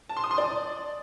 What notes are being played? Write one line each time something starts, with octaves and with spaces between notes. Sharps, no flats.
A5
C6
D#6
C6
D5